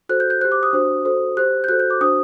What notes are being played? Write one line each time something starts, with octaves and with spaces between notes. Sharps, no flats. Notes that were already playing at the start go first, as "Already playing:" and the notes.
F#4 A4 C5 F#6
G6
G6
G4 C5 F#6
D6
D#6
D4 F#4 C5
F#4 A4 C5
G4 C5 F#6
G6
F#4 A4 C5 F#6
G6
D6
D4 F#4 C5 D#6